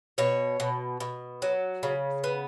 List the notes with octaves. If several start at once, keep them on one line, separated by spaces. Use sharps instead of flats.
B2 C#5
B2
B2
F#3
C#3
B3